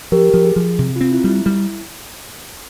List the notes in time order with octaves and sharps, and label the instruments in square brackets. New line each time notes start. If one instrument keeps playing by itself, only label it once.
[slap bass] F3 [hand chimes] G4 A#4
[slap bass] F3
[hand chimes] G#4
[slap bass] F3
C3
[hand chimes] F4
[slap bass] C4
[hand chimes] E4
[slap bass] G3 [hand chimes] E4
[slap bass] G3 [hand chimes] E4